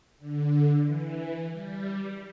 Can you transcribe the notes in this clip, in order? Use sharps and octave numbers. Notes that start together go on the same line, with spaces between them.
D3
E3
G3